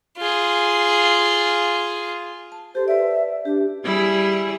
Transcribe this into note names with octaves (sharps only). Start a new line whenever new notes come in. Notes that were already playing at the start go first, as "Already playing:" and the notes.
F4 G#4
A5
G4 A4 C5
B4 D5 E5
D4 G4
G3 E4 G#4